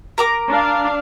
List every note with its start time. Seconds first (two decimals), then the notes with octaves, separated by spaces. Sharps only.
0.18 A#4 A#5 D6
0.50 D4 F5